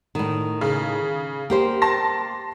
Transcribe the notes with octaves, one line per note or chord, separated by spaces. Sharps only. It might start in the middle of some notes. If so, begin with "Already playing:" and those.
A2 D#3
C#3
A#3 G4 C5
A5 C6 A#6